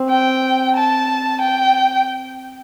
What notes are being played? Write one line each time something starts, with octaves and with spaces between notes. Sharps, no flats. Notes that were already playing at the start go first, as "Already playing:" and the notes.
Already playing: C4
G5
A5
G5